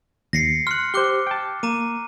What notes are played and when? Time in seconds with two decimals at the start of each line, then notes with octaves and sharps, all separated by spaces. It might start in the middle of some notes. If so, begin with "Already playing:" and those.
0.33 D#2 A#6 C7 C#7
0.67 C6 F6 F#6 C#7
0.94 G4 C5 D6 F#6 G7
1.27 G5 A5
1.63 A#3 A#5 D6 D#7